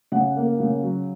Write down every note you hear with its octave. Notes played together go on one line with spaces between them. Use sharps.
C#3 F#5
A#3
C#3
F#3